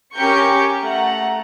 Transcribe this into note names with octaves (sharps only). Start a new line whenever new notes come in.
C#4 G4 A#4 C#6 G6 C#7
A3 F#5 A#5